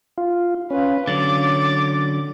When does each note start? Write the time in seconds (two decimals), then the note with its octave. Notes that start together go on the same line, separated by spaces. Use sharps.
0.18 F4
0.71 C#4 F4 B4
1.07 D3 F#3 C#4 C#5 D6 A6